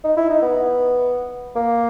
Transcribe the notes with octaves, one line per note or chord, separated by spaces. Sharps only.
D#4
E4
D#4
B3
A#3